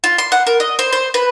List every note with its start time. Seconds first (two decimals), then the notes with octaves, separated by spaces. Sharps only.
0.04 F4
0.18 C6
0.32 F#5
0.47 A#4
0.60 D#5
0.79 C5
0.93 C5
1.14 B4